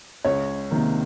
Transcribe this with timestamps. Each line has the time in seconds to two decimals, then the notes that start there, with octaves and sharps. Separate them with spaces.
0.25 C#2 C#5
0.71 C3 D#3 A#3